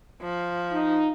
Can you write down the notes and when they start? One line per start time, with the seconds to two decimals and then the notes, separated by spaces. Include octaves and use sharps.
0.22 F3
0.72 D#4